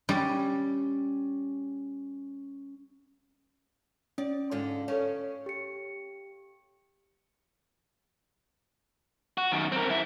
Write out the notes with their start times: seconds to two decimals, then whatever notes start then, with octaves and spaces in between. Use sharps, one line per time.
0.09 G3 C#4
4.18 C#4 D5
4.51 G#2 D3 F4
4.88 C#4 A4 C#5
5.46 G4 C#7
9.38 F#4
9.52 F#2 D#3
9.72 C4 A#4
9.89 F#2 E4